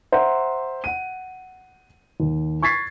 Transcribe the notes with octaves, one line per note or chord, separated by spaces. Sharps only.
C5 E5 F#5 A#5
F#5 D#7
D#2
C#6 G#6 A6 B6 C7